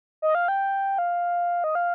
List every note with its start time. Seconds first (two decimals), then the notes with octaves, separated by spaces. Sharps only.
0.22 D#5
0.35 F5
0.48 G5
0.98 F5
1.64 D#5
1.75 F5